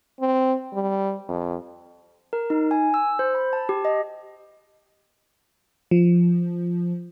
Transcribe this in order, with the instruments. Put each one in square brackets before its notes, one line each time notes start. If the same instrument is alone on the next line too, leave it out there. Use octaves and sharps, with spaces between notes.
[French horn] C4
G3
F2
[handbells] A#4
D#4
G#5
E6
C5
B5
A5
G4
D#5
[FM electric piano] F3